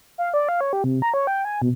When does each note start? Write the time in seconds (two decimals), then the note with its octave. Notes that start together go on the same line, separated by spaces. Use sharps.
0.18 F5
0.34 D5
0.49 F5
0.61 C#5
0.73 G4
0.84 C3
1.02 A#5
1.14 C#5
1.27 G5
1.45 G#5
1.62 B2